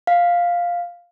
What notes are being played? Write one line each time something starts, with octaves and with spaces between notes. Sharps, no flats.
F5